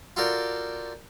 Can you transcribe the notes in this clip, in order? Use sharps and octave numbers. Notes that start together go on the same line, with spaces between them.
F4 F#4 A4 A#4 D5 G5